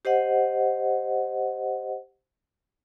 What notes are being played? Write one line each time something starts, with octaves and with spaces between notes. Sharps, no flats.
G4 C5 D#5 F#5